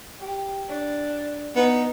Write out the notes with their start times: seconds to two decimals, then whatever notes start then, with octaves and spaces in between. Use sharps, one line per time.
0.20 G4
0.69 D4
1.56 B3 D#4 B4